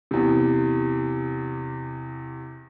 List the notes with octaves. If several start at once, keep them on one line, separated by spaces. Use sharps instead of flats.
E2 C3